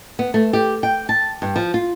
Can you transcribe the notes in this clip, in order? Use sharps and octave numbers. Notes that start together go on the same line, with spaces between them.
B3
A3
G4
G5
A5
G2
F3
F4